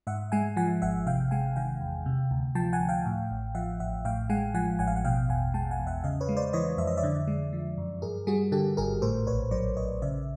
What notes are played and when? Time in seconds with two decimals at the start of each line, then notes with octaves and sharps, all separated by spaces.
0.07 G#2 E5 F#5
0.32 G#3 F#5 G#5
0.57 F3 F#5 G#5
0.82 G#1 E5 F#5
1.06 C3 F5 G5
1.31 G#3 F#5 G#5
1.56 D#3 F5 G5
1.81 E2
2.06 C3
2.31 D2
2.55 F3 G5 A5
2.73 F#5 G#5
2.80 D2
2.89 F5 G5
3.05 A2
3.31 A1
3.55 F3 E5 F#5
3.80 A1 E5 F#5
4.05 A2 F5 G5
4.30 G#3 F#5 G#5
4.54 F3 F#5 G#5
4.79 A1 F#5 G#5
4.87 F5
4.96 F#5
5.05 B2 F5 G5
5.29 E2 F#5 G#5
5.54 G#3 G5 A5
5.71 F#5 G#5
5.79 E2
5.87 E5 F#5
6.04 C#3 D#5 F5
6.21 B4 C#5
6.29 G#3
6.37 C5 D5
6.53 E3 C#5 D#5
6.78 F2 E5
6.87 D#5
6.97 D5 E5
7.03 D3
7.28 G#3
7.53 F3
7.78 F#2
8.02 G2 G#4 A#4
8.27 G3 F#4 G#4
8.52 D3 G4 A4
8.77 G#1 G#4 A#4
9.02 A2 A#4 C5
9.27 A#1 B4 C#5
9.51 F#3 C5 D5
9.77 A#1 C#5 D#5
10.02 C#3 D5 E5